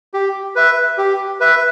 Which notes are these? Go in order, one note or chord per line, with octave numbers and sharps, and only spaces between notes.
G4
B4 E5
G4
B4 E5